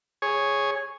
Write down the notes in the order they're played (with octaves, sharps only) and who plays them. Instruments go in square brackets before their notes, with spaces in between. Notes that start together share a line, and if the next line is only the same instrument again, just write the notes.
[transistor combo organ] G#4 C#5